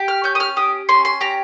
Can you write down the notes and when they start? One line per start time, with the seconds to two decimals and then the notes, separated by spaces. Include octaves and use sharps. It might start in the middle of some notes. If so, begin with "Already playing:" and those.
Already playing: G4
0.08 F6
0.24 C#4 G6
0.35 D#6
0.40 F6
0.57 G4 D#6
0.89 C#4 C6
1.05 C6
1.21 G4 A#5